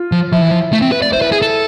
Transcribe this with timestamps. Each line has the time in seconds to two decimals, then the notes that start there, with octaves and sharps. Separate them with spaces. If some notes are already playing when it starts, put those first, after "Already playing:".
Already playing: F4
0.12 F3
0.32 F3 E4
0.42 E3
0.51 F3
0.73 A3
0.82 C4
0.92 B4
1.02 D5
1.12 E4 C5
1.22 B4
1.32 G#4
1.42 A4